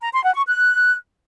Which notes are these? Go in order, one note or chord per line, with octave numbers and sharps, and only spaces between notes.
A#5
C6
F#5
C#6
F#6